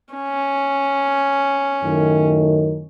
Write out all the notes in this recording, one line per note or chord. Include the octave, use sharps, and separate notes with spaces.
C#4
F#2 A2 D#3